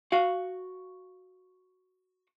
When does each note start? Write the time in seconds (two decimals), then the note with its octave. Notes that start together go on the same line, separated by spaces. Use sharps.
0.12 F#4 F5